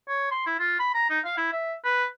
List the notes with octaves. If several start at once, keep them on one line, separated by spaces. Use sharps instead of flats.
C#5
C6
E4
F4
B5
A#5
D#4
F5
E4
E5
B4